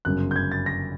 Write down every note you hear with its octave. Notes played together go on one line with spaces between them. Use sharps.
G1 F#2 C#3 F#6
G6
G#6
A6
A#6